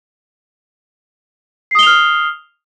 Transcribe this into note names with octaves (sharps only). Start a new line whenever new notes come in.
D#6 F6 C7 F7 G7